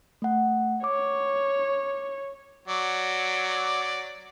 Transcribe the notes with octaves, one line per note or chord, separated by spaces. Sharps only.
A3 F#5
C#5 D6
F#3 D5